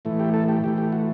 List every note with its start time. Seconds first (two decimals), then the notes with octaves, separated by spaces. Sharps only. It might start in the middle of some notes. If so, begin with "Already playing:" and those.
0.05 A2 E3 A3
0.20 G4
0.34 A4
0.48 G4
0.64 A2 E3 A3 G4
0.78 G4
0.92 F#4